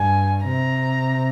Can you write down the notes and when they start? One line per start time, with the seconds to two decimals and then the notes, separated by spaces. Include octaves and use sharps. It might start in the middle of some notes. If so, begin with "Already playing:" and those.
Already playing: G2 G#5
0.45 C3 A#5